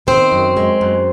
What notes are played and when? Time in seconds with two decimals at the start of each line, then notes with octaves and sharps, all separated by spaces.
0.07 D#3 C4 C5
0.32 F#2
0.57 G#3
0.81 F#2